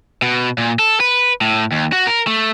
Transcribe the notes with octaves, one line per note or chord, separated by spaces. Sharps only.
B2
A#2
A4
B4
A2
D#2
F#4
A#4
A3